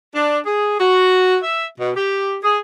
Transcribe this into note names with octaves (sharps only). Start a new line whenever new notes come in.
D4
G#4
F#4
E5
B2
G4
G#4